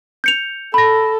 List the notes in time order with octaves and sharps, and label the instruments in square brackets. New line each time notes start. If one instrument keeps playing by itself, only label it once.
[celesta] G6 C#7 F7
[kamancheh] A4 [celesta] B5 A#6